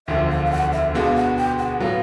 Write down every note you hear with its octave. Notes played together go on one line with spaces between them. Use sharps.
E1 D2 D3 F3 E5
F5
F5
F#5
E5
B2 G#3 B3 D4 F#4 F5
F#5
G5
F#5
A2 F#3 B3 F5